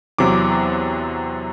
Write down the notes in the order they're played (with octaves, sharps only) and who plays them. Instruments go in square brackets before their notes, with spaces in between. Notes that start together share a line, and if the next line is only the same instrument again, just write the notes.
[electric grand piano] E2 C3 F#3 D6